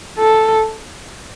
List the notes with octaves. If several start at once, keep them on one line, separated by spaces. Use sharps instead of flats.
A4